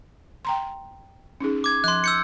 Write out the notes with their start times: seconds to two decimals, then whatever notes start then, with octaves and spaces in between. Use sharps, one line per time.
0.45 G5 A#5 C6
1.40 C#4 D#4 G#4
1.64 D6 G#6
1.84 F3 C6 F#6
2.04 E6 G6 C#7